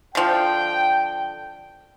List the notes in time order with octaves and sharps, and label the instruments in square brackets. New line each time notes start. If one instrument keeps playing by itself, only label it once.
[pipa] D3 F3 [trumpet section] G5